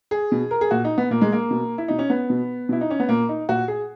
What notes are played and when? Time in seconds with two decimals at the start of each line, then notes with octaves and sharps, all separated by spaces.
0.11 G#4
0.32 B2
0.51 A#4
0.61 G#4
0.71 A#2 F#4
0.84 D#4
0.98 B3
1.11 A#2 A#3
1.21 G#3
1.32 A#3
1.51 B2
1.78 E4
1.88 B2 D#4
1.99 C#4
2.10 B3
2.30 B2
2.69 B2 E4
2.81 D#4
2.90 C#4
3.00 B3
3.09 A#2 A#3
3.29 D#4
3.49 A#2 F#4
3.68 G#4